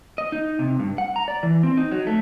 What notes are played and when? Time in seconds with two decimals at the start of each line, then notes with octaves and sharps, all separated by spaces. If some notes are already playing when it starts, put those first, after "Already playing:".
0.18 D#5
0.32 D#4
0.59 C3
0.79 G2
0.98 F#5
1.16 A#5
1.28 D5
1.43 E3
1.63 C4
1.77 D#4
1.91 F#3
2.07 A3